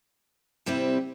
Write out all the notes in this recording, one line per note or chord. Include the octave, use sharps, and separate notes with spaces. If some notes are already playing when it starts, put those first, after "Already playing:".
C3 G3 C4 E4